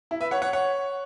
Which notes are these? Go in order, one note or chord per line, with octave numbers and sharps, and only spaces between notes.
E4
B4 E5
C#5 F#5
C#5 F#5
C#5 F#5